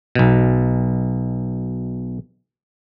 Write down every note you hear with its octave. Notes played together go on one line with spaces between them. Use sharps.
B1 B2